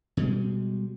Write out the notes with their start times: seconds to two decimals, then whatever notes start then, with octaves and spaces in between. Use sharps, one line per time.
0.17 B2 G3 G#3